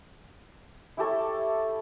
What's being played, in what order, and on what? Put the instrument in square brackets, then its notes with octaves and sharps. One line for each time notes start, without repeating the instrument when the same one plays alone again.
[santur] E4 G4 A4 C#5